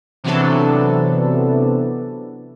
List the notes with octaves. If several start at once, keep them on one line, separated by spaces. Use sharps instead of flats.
C3 E3 F#3 B3 D4 A4